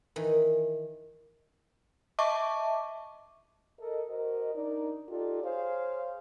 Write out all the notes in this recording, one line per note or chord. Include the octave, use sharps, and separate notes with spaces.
D#3 E3
D#5 E5 A5 C#6 D6
A4 A#4 D#5
F#4 A#4 C5 D#5
D4 D#4 A#4 D5
D#4 F4 G4 A4 D5
G#4 C5 C#5 F5